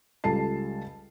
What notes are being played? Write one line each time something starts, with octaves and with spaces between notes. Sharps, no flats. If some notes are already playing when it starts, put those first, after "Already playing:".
C#2 G3 A4 A5 C7